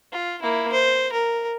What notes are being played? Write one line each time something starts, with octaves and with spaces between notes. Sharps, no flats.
F4
A#3 E4
C5
A#4